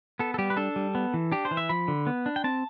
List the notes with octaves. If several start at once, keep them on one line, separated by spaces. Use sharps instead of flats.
B3 A4
A4
G3 G4
B4
D4 A4
G3
B3
E3
D4 G4
C5
E3
E5
F3 B5
D3
B3
D4
G5
C4 A5